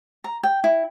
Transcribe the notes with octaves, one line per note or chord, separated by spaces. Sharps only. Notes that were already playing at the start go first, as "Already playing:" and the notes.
A#5
G5
E4